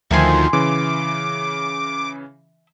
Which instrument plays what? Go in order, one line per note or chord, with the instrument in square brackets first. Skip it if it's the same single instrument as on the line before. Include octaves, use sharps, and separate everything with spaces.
[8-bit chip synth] D2 D#3 F3 [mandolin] E5 G#5 C6
[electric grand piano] C#3 E3 [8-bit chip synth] D6